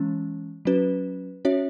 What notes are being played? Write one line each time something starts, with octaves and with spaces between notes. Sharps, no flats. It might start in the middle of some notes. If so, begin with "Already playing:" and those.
Already playing: E3 G#3 C#4
F#3 C#4 F#4 B4
C#4 F#4 C#5 E5